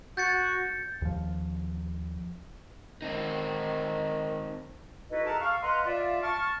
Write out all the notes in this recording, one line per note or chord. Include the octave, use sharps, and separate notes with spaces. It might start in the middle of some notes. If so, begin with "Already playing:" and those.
F#4 G6 A6 C#7
D#2 F3
D#3 C4 D#4
D#4 E4 F#4 A4 B4 D#5
G#4 A#4 E5 F#5 A5 A#5
A4 F5 C#6 F6
B4 D#5 F5 F#5 A#5 C6
F4 D5 E5 F5
A5 C#6 F6